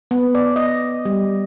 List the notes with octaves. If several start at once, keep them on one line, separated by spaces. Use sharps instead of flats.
B3
D5
D#5
G3